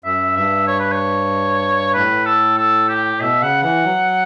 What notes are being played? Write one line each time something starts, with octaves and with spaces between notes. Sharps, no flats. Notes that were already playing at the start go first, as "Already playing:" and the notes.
F#2 E5
G2 E5
C#5
B4
C#5
A2 B4
A4
A4
G4
B2 E5
C#3 F#5
E3 F#5
F#3